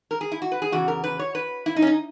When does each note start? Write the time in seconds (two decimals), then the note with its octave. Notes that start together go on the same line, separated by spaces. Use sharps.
0.11 A#4
0.21 G#4
0.32 E4
0.42 F#4
0.52 B4
0.62 G#4
0.72 E2 C#3 F#4
0.88 A#4
1.04 B4
1.19 C#5
1.35 B4
1.66 E4
1.76 D#4
1.82 C#4
1.87 D#4